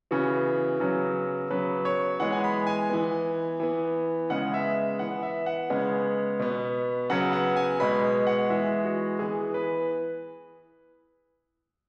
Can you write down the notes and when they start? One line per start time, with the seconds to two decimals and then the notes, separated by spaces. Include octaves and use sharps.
0.11 C#3 E3 B3 F#4
0.80 C#3 F#3 B3
1.50 C#3 F#3 B3 B4
1.85 C#5
2.20 E3 G#3 B3 F#5
2.32 G#5
2.44 B5
2.67 G#5
2.90 E3 B3
3.60 E3 B3
4.30 C#3 G#3 B3 F#5
4.54 E5
4.99 E3 B3 F#5
5.23 E5
5.46 F#5
5.70 C#3 G#3 B3
6.39 B2 B3
7.10 C#3 F#3 B3 F#5
7.33 F#5
7.56 G#5
7.80 B2 G#3 B3 B5
8.27 F#5
8.49 E3 G#3 B3 E5
8.85 F#4
9.19 E3 B3 G#4
9.54 B4